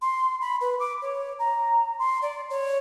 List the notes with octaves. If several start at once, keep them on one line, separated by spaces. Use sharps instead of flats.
C6
B5
B4
D6
C#5
A#5
C6
D5
C#5